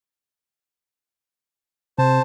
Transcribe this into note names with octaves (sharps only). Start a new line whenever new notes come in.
C3 C5 A5